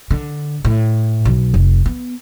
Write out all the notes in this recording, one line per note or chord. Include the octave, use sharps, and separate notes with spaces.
D3
A2
B1
F1
B3